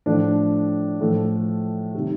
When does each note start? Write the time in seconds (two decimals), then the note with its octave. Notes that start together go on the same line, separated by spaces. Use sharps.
0.06 A2 F3 A3 D4
1.01 A2 F3 A3
1.95 C3 D#3 G3